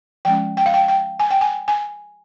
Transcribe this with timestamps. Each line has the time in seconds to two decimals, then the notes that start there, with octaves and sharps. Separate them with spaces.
0.25 F3 G#3 C#4 G5
0.57 G5
0.66 F5
0.74 G5
0.88 G5
1.20 G#5
1.31 G5
1.41 G#5
1.68 G#5